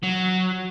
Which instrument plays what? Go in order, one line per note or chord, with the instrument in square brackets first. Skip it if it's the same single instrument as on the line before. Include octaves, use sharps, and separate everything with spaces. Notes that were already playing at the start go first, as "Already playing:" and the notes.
[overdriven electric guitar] F#3